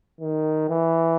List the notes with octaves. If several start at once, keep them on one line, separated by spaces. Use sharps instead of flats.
D#3
E3